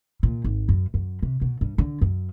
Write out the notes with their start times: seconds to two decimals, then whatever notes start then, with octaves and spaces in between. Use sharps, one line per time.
0.23 A#2
0.44 G#1
0.69 F#2
0.94 F#2
1.22 C3
1.41 B2
1.61 G2
1.78 D3
2.01 F#2